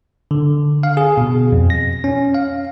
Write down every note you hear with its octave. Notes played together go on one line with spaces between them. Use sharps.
D3
F5
G#4
B2
F2
A#6
C#4
F5